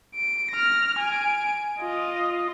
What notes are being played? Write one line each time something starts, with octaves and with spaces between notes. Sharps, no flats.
D7
F6 A#6
G#5 D7
F4 D#5